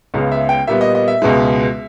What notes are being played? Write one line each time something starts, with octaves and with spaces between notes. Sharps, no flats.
C#2 C#3 G#3 B3
E5
G5
A#2 G3 B3 E5
D#5
D#5
E5
C#2 B2 G#3